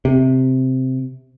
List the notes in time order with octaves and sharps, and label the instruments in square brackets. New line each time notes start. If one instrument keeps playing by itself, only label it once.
[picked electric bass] C3